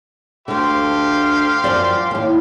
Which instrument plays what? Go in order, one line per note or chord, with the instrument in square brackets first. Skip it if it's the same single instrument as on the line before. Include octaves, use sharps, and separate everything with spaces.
[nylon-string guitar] D2 D3 [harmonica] G4 C5 F5
[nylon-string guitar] F#2 F3 D5
D#2 A2